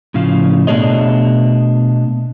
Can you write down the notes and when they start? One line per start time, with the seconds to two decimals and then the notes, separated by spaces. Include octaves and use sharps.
0.14 A2 C#3 F3 F5
0.67 B2 A3 D4 G#4 C#5 D#5